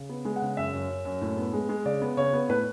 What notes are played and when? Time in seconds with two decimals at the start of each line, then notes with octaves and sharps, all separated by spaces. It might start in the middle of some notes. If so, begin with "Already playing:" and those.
Already playing: C#3
0.09 B3
0.25 G#3
0.36 F#5
0.42 C#3
0.57 F#2 E5
0.73 F#2
0.90 F#2
1.05 F#2
1.21 A2
1.37 B3
1.53 G#3
1.69 G#3
1.85 C#3 D5
2.02 B3
2.17 C#3 C#5
2.33 B3
2.49 A2 B4